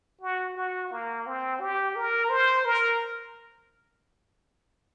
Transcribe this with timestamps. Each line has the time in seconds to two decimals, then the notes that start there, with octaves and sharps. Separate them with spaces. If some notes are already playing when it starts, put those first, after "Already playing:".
0.21 F#4
0.56 F#4
0.91 A#3
1.26 C4
1.60 G4
1.96 A#4
2.29 C5
2.65 A#4